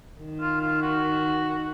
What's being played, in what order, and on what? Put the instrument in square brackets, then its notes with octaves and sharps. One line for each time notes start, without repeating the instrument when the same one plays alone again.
[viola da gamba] D#3
[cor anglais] F4
F4
F#4